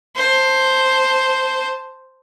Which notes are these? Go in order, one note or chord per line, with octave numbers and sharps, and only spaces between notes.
C5 A5